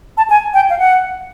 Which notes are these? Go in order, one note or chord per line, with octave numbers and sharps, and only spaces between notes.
A5
G#5
G5
F5
F#5